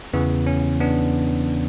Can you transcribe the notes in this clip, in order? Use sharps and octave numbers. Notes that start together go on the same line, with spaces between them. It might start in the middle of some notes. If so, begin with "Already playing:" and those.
E2 C#3 E3 B3
C#4
B3 D4